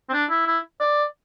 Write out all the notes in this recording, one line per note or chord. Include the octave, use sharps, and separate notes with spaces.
C4
D4
E4
E4
D5